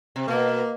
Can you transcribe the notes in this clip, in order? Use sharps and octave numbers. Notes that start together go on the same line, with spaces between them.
C3
B2 A#3